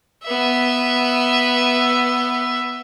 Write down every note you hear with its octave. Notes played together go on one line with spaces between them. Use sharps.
B3 E5